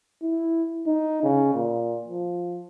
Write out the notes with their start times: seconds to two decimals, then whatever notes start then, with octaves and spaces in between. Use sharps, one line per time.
0.22 E4
0.87 D#4
1.23 C#3
1.55 A#2
2.08 F3